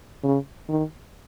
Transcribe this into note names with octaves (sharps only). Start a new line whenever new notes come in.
C#3
D#3